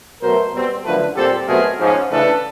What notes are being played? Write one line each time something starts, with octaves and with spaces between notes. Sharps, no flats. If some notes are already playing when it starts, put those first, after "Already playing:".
B2 F#3 A3 A#4 C5
B2 G3 C4
F#2 D3 F3 A3 A4 B4
A#2 G3 C4 G4 A4
B2 F#3 A3 C4 G#4 A#4
G#2 F3 G#3 C#4
C#3 E3 A3 D4 A4 B4